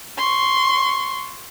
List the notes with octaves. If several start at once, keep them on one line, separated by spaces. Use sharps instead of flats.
C6 C#6